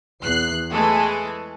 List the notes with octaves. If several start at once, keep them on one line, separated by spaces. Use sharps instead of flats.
E2 F#6 C7
E3 G#3 A3 G#4 A4